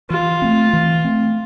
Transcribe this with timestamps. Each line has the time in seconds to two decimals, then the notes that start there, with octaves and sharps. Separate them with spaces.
0.10 E3 F4
0.42 A3 C4
0.73 E3
1.05 A3 C4